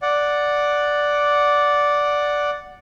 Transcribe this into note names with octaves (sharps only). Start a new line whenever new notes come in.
D5 F#5